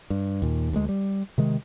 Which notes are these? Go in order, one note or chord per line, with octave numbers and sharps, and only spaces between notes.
G2
D#2 A#2
D2 G#3
G3
C3 D#3 G#3